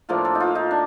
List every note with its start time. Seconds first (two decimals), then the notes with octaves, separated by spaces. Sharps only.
0.09 A2 F3 A#3 D4 F4
0.25 A4
0.35 D#4
0.40 F4
0.55 D#4
0.71 D4